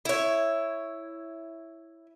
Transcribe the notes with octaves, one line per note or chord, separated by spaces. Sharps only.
E4 C#5